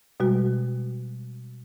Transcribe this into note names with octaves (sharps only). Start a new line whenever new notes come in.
B2 G3 G#3 F#4